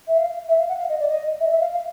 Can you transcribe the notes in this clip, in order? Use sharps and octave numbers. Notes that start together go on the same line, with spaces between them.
E5
F5
E5
F5
F#5
F5
D#5
D5
D#5
E5
D#5
E5
F5
F5